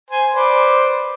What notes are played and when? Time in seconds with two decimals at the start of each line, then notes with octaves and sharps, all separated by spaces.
0.10 C5 G#5
0.34 B4 C5 D5